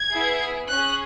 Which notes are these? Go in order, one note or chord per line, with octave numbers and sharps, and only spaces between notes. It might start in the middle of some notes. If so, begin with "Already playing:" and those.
Already playing: G#6
B3 E4 G#4
C#4 G#4 F#6